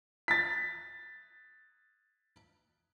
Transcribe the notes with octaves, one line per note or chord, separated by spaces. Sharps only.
A6 B6